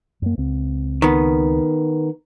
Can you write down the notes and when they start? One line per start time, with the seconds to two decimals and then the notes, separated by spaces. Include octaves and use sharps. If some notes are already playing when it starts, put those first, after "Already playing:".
0.22 F#2 A#3
0.38 C#2 C4
1.02 D#3 B3